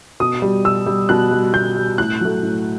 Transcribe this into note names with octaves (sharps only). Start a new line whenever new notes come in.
B2 D#6
G3
B2 E6
G3
B2 F#6
G3
B2 G6
G3
A2 F#6
F#3 A3
A2